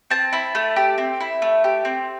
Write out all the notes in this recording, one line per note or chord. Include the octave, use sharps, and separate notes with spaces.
C4 A5
E4
A3
G4
C4
E4
A3
G4
C4